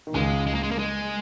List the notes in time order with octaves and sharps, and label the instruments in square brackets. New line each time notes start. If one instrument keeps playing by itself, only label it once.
[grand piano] D#3
[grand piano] C#2 C#3 [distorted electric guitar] G#3
[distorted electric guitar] G#3
A#3
G#3
A#3
G#3